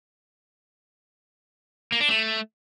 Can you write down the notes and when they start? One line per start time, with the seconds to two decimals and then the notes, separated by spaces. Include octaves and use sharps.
1.92 A#3
2.01 D4
2.09 A3